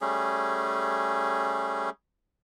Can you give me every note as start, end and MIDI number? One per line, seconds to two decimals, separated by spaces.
0.01 1.90 55
0.01 1.90 57
0.01 1.90 61
0.01 1.90 68